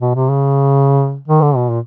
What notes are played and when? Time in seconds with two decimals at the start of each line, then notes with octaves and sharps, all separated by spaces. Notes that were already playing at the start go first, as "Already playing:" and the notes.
0.01 B2
0.15 C3
0.29 C#3
1.28 D#3
1.42 D3
1.56 B2
1.70 A#2